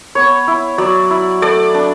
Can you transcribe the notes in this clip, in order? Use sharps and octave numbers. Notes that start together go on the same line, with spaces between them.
B3 C#5
E4
F#3 D5
E4
A3 D5
D4